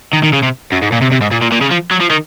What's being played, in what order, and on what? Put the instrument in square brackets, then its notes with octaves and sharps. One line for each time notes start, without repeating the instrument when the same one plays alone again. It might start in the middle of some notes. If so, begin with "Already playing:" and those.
[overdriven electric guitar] D#3
D#3
C#3
C3
F#2
G#2
A#2
C3
C3
G#2
A#2
A#2
A#2
C#3
F3
F#3
F3
D#3